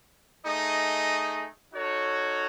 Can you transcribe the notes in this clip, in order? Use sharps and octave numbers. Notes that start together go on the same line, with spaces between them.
A3 D#4 G#4 D#5
D#4 F#4 A4 C#5